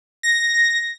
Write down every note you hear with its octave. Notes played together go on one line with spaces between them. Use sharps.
A#6